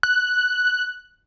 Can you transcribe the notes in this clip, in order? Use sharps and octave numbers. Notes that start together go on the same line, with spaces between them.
F#6